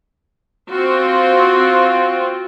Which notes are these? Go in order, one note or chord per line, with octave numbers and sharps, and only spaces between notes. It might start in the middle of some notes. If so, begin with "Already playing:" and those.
C4 F4 F#4